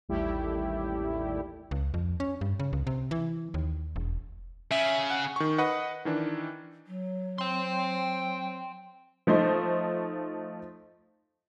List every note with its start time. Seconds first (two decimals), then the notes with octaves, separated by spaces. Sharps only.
0.09 A1 D#2 G3 A3 E4 G4
1.71 C#2
1.94 F2
2.20 C#4
2.41 G2
2.60 C#3
2.73 C#2
2.87 C3
3.11 E3
3.54 D#2
3.96 E1
4.72 C#3 E5
5.10 F#5
5.36 D#3 C#6
5.58 B4 D#5 F#5
6.05 D#3 E3 D4
6.87 F#3
7.38 C4 G5 C6
9.27 F3 A3 D#4 C5